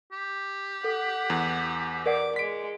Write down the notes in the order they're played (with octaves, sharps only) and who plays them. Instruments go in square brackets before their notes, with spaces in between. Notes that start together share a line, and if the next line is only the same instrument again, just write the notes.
[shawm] G4
[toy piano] A4 [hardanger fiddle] F#5
[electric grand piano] E2
[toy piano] A#4 D5 F#5 [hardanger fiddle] D6
[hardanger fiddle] G#3 [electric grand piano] B6 D7